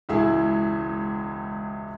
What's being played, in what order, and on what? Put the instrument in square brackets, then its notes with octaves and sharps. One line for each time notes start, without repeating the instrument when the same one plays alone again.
[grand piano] E1 C#2 E4 G#4 E5 E6